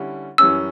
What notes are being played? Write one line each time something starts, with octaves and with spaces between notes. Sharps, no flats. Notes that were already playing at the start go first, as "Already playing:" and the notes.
Already playing: D3 G3 C#4 E4
F#2 E3 G3 C#4 E6